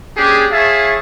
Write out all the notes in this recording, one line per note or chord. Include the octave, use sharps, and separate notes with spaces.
A#3 C#4 D4 G4 G#4
E4 G#4 C#5 E5 F5 A5